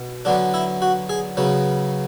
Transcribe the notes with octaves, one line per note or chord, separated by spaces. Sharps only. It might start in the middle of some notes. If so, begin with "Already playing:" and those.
Already playing: B2
D3 F#3 B3 D4
E4
F#4
G#4
C#3 F#3 B3